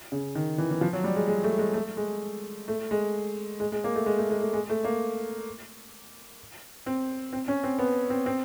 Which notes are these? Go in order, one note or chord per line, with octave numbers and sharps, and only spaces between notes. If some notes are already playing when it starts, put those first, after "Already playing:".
C#3
D#3
E3
E3
F3
F#3
G3
G#3
G#3
A3
G#3
A3
G#3
A3
G#3
G#3
G#3
A#3
A3
G#3
A3
G#3
A3
G#3
A3
A#3
C4
C4
C#4
C4
B3
C4
C4